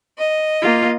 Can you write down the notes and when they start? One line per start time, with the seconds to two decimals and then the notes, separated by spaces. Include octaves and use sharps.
0.18 D#5
0.62 A#3 F4